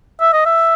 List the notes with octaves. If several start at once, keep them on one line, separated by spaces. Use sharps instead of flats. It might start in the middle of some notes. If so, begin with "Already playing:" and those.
E5
D#5
E5